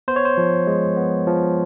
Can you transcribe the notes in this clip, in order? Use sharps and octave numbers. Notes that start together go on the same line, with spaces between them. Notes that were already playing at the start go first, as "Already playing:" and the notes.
B3 C5
C#5
C5
F3
G#3
B3
F3